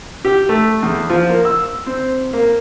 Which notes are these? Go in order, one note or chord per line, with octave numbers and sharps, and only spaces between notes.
G4
A3
E2
F3
A#3
E6
C4
A#3